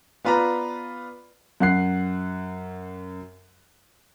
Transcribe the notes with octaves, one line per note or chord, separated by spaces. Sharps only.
B3 F4 B4 D5 A#5
F#2 F#5 F#6 C7